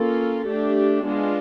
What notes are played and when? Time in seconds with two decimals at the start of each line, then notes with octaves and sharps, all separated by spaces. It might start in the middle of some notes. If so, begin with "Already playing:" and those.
Already playing: A#3 C#4 F4 A4
0.47 A3 D4 G4
1.06 G#3 B3 D4 F4